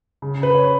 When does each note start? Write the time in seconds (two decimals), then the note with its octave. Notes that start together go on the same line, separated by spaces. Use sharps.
0.22 C#3
0.43 B4
0.55 C#5